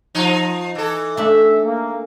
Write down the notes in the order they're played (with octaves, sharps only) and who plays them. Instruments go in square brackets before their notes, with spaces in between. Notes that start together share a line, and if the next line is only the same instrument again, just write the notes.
[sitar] F3 D#4
E3 A4
[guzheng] A3 D4 [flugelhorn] E5
[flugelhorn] A#3